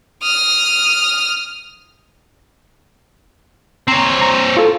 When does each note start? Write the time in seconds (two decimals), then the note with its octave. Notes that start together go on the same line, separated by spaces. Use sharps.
0.22 D#6 F6
3.88 C4 C#5 A#5 C7
4.21 A#5
4.57 F4 A4